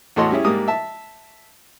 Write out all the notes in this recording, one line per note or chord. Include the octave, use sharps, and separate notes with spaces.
E2 A2 F#4 A4 D#5 C6
G3 C#4 E4 G#4
G#2 G3 A#3 D#6
E5 A5